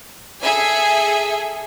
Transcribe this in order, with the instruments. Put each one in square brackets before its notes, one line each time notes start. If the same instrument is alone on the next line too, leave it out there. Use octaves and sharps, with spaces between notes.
[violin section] G#4 A4 E5 G#5